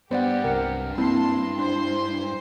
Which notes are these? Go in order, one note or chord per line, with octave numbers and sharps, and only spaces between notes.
G2 B3 G4 C5 D5 F#5
C2 A#4 F#5
A#3 C4 E4 A5 C6
D4 C5 C6